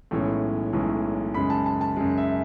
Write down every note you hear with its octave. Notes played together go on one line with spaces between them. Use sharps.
B1 A2 E3 G#3 C#4
B1 A2 E3 G#3 C#4
F#2 C#3 G#3 B5
A5
A5
A5
F#2 C#3 G#3
E5